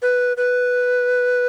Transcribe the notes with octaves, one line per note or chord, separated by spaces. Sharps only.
B4
B4